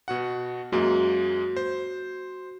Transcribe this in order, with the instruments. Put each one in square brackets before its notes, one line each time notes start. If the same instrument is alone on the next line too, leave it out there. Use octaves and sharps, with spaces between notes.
[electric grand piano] B2 F#4 F#5
[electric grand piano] F#2 G#3 A#3 [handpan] F#4
[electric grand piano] C5